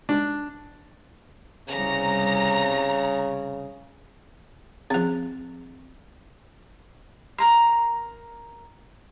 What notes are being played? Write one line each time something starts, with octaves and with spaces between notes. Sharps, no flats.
D4
C2 C#3 A#5
C#3 F3 C4 G#4
A#4 A#5 C6